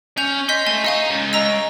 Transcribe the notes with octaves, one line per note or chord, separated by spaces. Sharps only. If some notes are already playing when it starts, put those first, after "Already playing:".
C#4 G6 F7
D#5 C6 G6 B6
A3 G#5
D#4 D#5 F5 G#5
G#3 C#4
D#5 A#5 E6